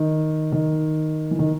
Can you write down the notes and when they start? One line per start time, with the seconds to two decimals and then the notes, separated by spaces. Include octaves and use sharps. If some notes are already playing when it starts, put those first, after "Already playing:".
Already playing: D#3
0.52 D#3
1.31 E3
1.39 D#3